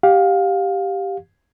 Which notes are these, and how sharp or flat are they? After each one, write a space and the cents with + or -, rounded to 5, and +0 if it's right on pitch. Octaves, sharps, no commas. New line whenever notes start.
G4 +0 F5 +20